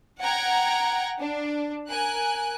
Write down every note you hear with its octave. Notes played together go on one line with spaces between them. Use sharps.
F#5 G5 A#5 G#6
D4
A#4 G#5 F#6